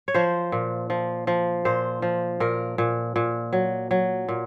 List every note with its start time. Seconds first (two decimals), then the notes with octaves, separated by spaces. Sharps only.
0.08 C#5
0.14 F3 C5
0.52 A#2
0.90 F3
1.27 F3
1.65 A#2 C5
2.02 F3
2.40 A#2 A#4
2.78 A#2
3.16 A#2
3.53 F#3
3.91 F#3
4.28 A#2